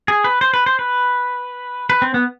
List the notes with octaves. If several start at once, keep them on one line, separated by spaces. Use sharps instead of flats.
G#4
B4
C5
B4
C5
B4
B4
C4
B3